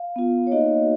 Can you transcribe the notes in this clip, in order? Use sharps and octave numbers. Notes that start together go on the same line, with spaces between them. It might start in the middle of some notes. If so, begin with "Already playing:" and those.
Already playing: F5
B3 F4
C#5
A#3 D#4 F#4 D#5